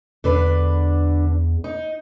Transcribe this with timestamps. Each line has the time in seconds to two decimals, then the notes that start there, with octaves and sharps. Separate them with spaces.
0.24 E2 D3 D4 B4
1.64 D#4